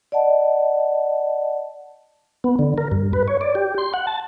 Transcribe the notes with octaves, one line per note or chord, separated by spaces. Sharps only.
D5 D#5 F#5 A5
B3
D3
A#4
G2
B4
C#5
D5
G4
C6
F#5
A5